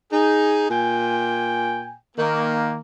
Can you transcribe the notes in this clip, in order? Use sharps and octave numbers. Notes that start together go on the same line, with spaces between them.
D#4 G#4
A#2 G5 G#5
D#3 A#3